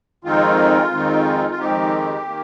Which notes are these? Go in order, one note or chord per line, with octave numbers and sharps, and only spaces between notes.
F2 D#3 G#3 C4 D#4 F4
F2 D#3 G#3 C4 D#4
F4
F2 D#3 G#3 C4 D#4 G4
D#3 A#3